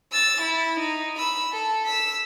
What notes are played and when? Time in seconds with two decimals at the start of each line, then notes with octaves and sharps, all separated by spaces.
0.12 E6 A6
0.41 E4
0.80 D#4
1.18 B5 E6
1.52 A4
1.85 E6 B6